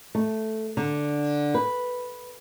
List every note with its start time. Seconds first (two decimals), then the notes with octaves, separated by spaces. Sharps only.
0.15 A3
0.77 D3
1.54 B4